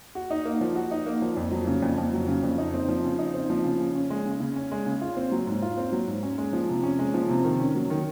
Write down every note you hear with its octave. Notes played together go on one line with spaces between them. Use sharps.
F#4
D#4
A#3
F3
F#4
D#4
A#3
F3
F2
F#3
C#3
F2
F2
F#3
C#3
F2
D#4
C4
F3
C#3
D#4
C4
F3
C#3
C#3
C#4
G#3
C#3
C#3
C#4
G#3
C#3
F4
C4
F#3
G#2
F4
C4
F#3
G#2
C#4
G#3
F3
C3
C#4
G#3
F3
C3
D#3
C#4
F#3
D#3